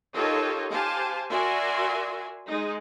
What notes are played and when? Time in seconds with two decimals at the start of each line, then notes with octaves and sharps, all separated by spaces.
0.13 D#4 F4 G4 A4 A#4 C#5
0.72 G4 C5 F5 G#5 A5
1.30 F#4 A#4 D5 E5 G#5 C6
2.48 G#3 D#4